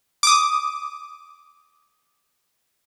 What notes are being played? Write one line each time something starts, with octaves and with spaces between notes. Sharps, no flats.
D6 D#6